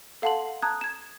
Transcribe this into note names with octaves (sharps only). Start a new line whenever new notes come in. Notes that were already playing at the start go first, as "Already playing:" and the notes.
A4 F5 F#5 A5 C6 F#7
A5 A#5 D#6 F#6 G#6
G#6 E7